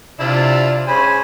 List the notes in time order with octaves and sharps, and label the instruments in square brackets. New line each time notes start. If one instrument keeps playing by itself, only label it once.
[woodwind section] C3 [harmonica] D4 E4 F4
[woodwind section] C#4 C#5 B5 [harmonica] G#4 C5 G#5